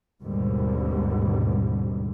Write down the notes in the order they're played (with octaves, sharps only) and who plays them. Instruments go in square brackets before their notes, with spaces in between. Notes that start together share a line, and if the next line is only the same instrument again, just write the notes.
[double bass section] G#1 D#2 G#2 B2 D3 G3